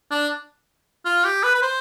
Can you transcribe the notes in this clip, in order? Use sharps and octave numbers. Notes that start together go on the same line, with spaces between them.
D4
F4
G4
B4
B4
C5